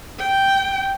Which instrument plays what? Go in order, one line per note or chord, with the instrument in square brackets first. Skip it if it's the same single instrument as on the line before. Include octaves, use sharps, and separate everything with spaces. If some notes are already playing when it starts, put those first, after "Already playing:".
[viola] G5